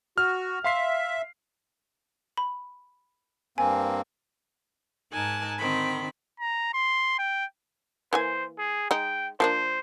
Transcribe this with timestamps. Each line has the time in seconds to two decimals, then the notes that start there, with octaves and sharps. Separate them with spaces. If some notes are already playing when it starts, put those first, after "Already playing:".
0.18 F#4 F6
0.64 E5 F5 C6 C7
2.37 B5
3.58 G2 A#3 C4 G#5
5.12 G#2 D#4 A#4 G#5 A5 F#6
5.58 D3 D#3 C4 B5
6.40 A#5
6.74 C6
7.19 G5
8.13 E3 A#3 C5 G#5
8.58 G#4
8.91 G#3 D#4 G5
9.40 F3 A#3 D4 C5